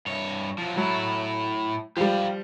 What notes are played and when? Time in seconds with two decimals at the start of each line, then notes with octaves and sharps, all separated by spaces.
0.06 G2 C#5
0.58 F3 F#3
0.77 A2 F#3 E4
1.97 F3 G3 G4 F5